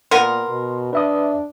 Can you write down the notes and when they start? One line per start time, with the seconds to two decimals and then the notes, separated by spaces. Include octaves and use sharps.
0.11 A#2 B3 A#4 C6
0.49 B2
0.93 D4 B4 E5 D#6